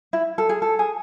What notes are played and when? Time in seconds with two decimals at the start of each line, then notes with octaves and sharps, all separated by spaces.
0.13 E4
0.38 A4
0.49 G#4
0.62 A4
0.79 G#4